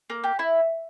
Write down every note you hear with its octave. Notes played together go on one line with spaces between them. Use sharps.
A#3
G4
E4